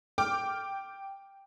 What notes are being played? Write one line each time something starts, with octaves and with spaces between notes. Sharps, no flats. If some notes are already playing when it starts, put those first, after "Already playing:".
G5 D6 F6